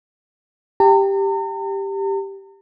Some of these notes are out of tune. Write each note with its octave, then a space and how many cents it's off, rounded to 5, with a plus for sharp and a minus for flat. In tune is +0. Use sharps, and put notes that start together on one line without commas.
G4 +0 A#5 -45